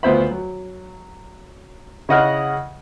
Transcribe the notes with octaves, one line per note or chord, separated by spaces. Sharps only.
D2 B3 F4 C5 E5 B5
F#3
C#3 E4 D#5 F#5 F6 F#6